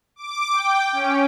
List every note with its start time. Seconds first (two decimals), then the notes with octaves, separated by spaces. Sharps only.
0.16 D6
0.52 G5
0.92 C#4